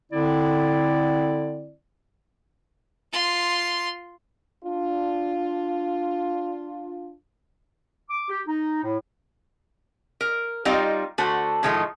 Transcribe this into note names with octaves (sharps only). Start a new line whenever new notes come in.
D3 C4 E4 D5
F4 C6
D4 F4
D6
G4
D#4
A2
A#4
G3 C4 D#4 F4 D#5 F5
D3 A3 F#4 C5
A2 D#3 F3 G#3 A3